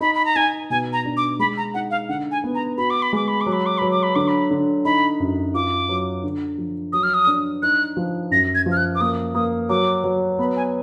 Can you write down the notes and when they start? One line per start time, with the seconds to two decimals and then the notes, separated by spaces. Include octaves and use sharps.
0.01 D#4 B5
0.15 B5
0.25 A#5
0.36 D#4 G#5
0.70 B2 G#5
0.93 A#5
1.05 D4
1.17 D6
1.39 G#3 B5
1.57 A#5
1.74 D#4 F#5
1.91 F5
2.09 D3 F#5
2.31 G#5
2.44 B3
2.55 A#5
2.78 F#4 B5
2.90 D6
3.02 B5
3.13 G#3 D6
3.28 B5
3.41 D6
3.46 F#3
3.53 B5
3.66 D6
3.78 F#3 B5
3.91 D6
4.03 B5
4.16 D3 D6
4.28 B5
4.51 D3
4.85 D#4 B5
5.20 F#2
5.54 F4 D6
5.89 F#3
6.23 D3
6.58 F3
6.93 F#3 D#6
7.03 F6
7.14 D#6
7.27 D4
7.62 D#4 F#6
7.97 F3
8.31 F#2 A#6
8.55 G#6
8.66 F3
8.72 F6
8.77 F#6
8.95 D6
9.01 A#3 D#6
9.35 A#3 D#6
9.69 F#3 D6
10.04 F#3
10.38 B3 B5
10.56 G#5